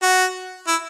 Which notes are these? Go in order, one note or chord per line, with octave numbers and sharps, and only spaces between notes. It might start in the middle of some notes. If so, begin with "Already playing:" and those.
F#4
E4